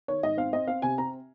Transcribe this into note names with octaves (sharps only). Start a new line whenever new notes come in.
D#3 C#5
G#2 D#5
C4 F5
C4 D#5
C4 F5
C3 G#5
C4 A#5